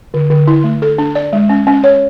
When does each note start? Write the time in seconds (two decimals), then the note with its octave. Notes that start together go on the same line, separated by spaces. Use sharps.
0.14 D3
0.30 D3
0.47 E4
0.64 A3
0.82 A4
0.98 D4
1.15 D5
1.33 G#3
1.49 C#4
1.67 C#4
1.84 C#5